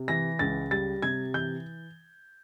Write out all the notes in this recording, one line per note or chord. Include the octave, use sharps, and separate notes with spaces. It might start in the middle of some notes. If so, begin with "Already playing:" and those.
Already playing: C3
E3 A#6
C#2 A6
G3 A6
C3 G#6
E3 G6